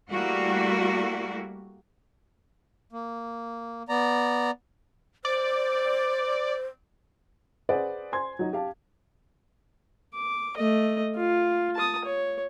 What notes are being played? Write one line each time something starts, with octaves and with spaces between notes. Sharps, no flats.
G3 A3 A#3 E4 F#4
A#3
B3 D5 A#5
C5 D5
G#4 B4 C5 D5 F#5
C5 G#5 C6 G#6
F#3 D#4
G4 F5 A5
D6
A3 D#5
F4
A5 D#6
C#5